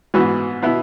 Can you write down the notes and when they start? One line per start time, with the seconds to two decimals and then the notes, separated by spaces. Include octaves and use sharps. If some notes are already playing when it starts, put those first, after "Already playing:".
0.14 G#2 E3 B3 F#4
0.62 B2 B3 E4